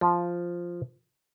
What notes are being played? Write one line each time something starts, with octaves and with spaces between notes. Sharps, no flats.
F3